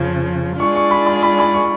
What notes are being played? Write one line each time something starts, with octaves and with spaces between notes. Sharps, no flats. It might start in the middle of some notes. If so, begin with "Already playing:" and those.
Already playing: F2 C#3 F3
G#3 D4 F4 G#4 D5 C#6
C#6
B5
B5
B5
B5
C#6